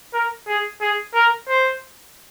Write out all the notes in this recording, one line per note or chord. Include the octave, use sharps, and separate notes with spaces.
A#4
G#4
G#4
A#4
C5